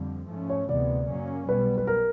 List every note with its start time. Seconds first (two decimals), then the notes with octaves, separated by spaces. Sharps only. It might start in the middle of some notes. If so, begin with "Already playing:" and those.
Already playing: F2 D3 G3
0.29 G#2 F3 A3 C#4
0.50 C#5
0.69 D2 C3 E3 G#3 B3 D5
1.09 F#2 C#3 F#3 A#3 C#4
1.47 B1 B2 G3 B3 B4
1.78 B4
1.87 A#4